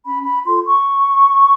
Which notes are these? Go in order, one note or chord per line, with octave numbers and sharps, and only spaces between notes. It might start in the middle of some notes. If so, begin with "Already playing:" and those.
C#4 B5
B5
F4 A4 C6
C#6